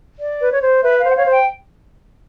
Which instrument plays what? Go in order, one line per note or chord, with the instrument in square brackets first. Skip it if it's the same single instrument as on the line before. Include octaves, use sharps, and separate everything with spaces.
[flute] D5
[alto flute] B4
C#5
C5
[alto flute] B4 [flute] E5
[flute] F5
[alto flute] C5
[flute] F#5
[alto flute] C#5 [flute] F5
[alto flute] C5
[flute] G5